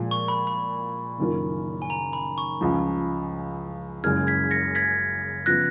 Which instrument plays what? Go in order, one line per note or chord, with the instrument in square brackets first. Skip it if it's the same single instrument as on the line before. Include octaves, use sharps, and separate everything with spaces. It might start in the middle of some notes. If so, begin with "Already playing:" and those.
Already playing: [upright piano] A#2 F3 G#3
[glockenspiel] C#6
B5
B5
[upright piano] F#1 F#2 D#3 A#3 F4
[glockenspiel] G#5
A#5
B5
C#6
[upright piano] C#2 C#3 F3
[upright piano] F#1 F#2 C#3 G#3 [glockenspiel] F6 G#6
[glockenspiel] G#6 B6
A#6 C#7
G#6 B6
[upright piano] C#3 F3 B3 F4 [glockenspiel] F#6 A#6